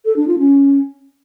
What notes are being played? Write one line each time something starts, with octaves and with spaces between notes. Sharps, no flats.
A4
D4
F4
C#4